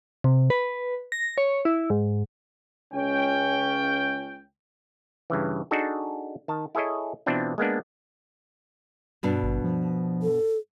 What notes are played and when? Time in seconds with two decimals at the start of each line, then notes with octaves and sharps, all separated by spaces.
0.24 C3
0.50 B4
1.12 A#6
1.38 C#5
1.65 E4
1.90 G#2
2.94 C#2 C#4 G5
5.30 G2 C#3 E3
5.71 D4 D#4 F#4 G#4 A4
6.48 D#3 A5
6.75 E4 G#4 A4 C#5 D#5
7.26 B2 E3 C4 D4 F4
7.58 G#3 A#3 B3 D4
9.23 G2 B2 D4
9.43 G#1
9.64 F3
10.23 A4